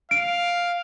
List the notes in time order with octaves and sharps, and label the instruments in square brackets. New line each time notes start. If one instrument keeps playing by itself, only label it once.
[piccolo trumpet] F5 [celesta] D7